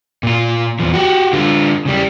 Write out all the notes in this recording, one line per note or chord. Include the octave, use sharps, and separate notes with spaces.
A#2 F4
E2 F3
F#4 G4
D3 F4
C#3 G3